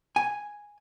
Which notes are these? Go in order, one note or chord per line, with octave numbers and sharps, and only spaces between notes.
G#5